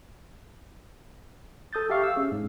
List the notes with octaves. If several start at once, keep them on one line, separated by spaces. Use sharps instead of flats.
A4 D#6 G6 A6
G4 E5 F5 C#6
E6
C#4 G#4
G#2